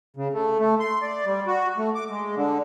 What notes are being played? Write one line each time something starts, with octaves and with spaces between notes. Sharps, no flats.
C#3
A3
A3
C6
D5
G3
F#4
A3
D6
G#3
D3